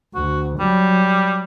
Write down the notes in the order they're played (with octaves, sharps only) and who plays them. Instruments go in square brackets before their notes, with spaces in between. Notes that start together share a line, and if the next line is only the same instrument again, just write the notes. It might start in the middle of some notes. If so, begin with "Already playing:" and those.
[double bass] D2 [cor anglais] F#4
[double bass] F#3 [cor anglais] G3